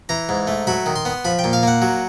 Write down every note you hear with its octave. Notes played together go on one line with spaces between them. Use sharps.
E3 A#5
G#2
A3
F#3 B5
D#3
C6
B3
F3 B5
G5
A#2
F5
A#3 F#5
F#3